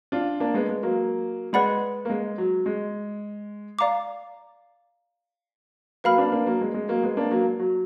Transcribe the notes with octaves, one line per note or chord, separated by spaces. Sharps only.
D4 F4
A#3 D4
G#3 B3
G#3
F#3 A#3
G#3 B4 D5 F#5 B5
A#3
G#3
F#3
G#3
D5 F5 A#5 D6
F#3 A#3 B4 F5 B5 F6
A#3 D4
A#3 D4
F#3 A#3
G#3
G#3
F#3 A#3
G#3 B3
A#3 D4
F#3 A#3
F#3